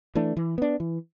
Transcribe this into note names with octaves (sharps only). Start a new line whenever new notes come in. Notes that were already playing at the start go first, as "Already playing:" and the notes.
E3 A3 D4
E3
B3 D4
E3